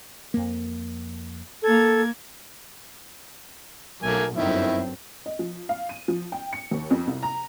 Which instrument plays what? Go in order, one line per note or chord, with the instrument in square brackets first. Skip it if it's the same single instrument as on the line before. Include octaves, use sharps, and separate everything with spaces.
[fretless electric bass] F2 A#3
[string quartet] A#3 G#6 [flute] A4
[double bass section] B1 [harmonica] A3 A#3 G#5
[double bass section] G1 F#2 C4 [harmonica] D#3 E4
[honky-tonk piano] D#5
F3
F5
D#7
F3
G5
C#7
D#2
F2
C2
A#5